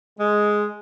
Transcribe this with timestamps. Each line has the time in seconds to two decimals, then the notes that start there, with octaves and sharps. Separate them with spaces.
0.19 G#3